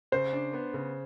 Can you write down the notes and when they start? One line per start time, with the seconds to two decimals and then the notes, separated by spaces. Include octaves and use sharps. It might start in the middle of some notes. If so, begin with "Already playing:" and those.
0.12 C#3 C5
0.33 D4
0.53 B3
0.73 C#3